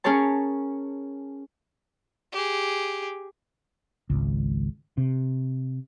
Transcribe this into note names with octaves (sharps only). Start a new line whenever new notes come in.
C#4 G#4 A#4 C#5 A5
G4 G#4
G#1 C#2
C3